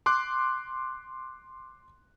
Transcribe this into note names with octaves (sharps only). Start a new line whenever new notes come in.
C6 D6 F#6